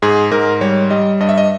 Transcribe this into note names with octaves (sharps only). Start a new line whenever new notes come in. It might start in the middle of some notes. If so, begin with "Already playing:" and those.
G#2 G#4
G#2 A#4
G3 C#5
G3 D#5
G2 D#5
E5
D#5